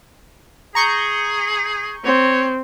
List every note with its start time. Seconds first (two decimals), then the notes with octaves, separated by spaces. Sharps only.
0.75 G#4 A#5 C#6 G6
2.05 C4 C#5